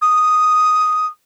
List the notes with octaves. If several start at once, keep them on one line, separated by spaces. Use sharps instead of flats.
D#6